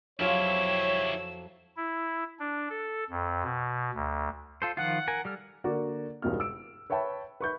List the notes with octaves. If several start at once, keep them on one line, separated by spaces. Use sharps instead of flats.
F2 F#3 E4 F4 G4 C#5 E6
E4
D4
A4
F2
B2
D2
F4 A4 C5
D#3 F3 F4 F#5
A#4 G#5
G3 A4 F6
D3 A#3 F#4 D5
E1 C#2 G2 B2 A#4 F6
E6 D7
B4 C#5 E5 G5 A5 B5
B4 C#6 G6